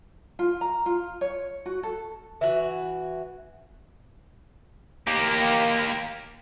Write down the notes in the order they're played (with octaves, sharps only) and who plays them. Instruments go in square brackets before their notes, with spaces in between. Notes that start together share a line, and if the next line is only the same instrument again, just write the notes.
[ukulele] F4
A#5
F4
C#5
F#4
A4
[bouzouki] E3 F#4
[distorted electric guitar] A#3 G4